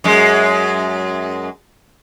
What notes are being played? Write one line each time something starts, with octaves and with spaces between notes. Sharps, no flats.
F#2 G#3